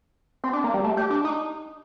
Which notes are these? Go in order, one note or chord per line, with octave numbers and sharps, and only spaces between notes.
C4
D4
A#3
G3
A3
G4
D4
D#4